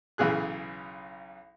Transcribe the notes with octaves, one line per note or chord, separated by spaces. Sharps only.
B1 C#3 E3 G#4 F#6